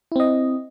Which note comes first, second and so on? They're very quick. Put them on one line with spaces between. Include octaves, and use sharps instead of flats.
E4 C4 D#5